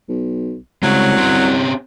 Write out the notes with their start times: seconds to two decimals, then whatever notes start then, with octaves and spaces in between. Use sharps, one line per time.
0.09 B1
0.83 C2 C#3 F#3 G#3
1.17 C4 C#4 G4